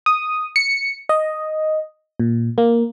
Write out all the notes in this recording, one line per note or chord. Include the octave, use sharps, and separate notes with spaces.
D#6
C#7
D#5
A#2
A#3